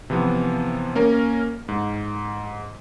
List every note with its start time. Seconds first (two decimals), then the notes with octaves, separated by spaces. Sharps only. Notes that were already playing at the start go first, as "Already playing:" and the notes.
0.10 C3 E3 F3 B3
0.95 A#3 C#4 A#4
1.68 G#2